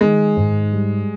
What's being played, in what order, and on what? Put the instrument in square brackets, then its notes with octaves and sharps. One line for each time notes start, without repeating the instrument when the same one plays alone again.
[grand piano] D#3 [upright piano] G#3
[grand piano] G#2
G3